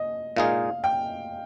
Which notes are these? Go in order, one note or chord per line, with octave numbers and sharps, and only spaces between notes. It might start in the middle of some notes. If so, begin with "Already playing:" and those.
Already playing: D#5
A#2 G#3 D#4 G#4 F5
G5